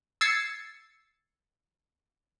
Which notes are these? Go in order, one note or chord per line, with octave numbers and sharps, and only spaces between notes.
E6 G#6 A6 C7 C#7